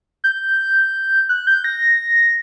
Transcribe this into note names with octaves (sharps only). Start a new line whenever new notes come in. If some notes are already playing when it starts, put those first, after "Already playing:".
G6
F#6
G6
A#6